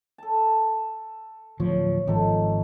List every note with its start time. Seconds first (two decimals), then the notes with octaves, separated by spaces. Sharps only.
0.18 A4 A5
1.60 D1 F3 C#5
2.07 G#1 D#3 F3 A4